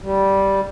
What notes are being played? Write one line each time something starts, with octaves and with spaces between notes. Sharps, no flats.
G3